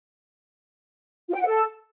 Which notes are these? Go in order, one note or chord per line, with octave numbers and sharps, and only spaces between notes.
F4
G5
F#5
A4